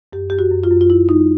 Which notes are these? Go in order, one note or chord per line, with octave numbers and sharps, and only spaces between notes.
F#2 G4
F#2 G4
F#4
F#2
F4
F#2
F4
F#2 E4
G3 D#4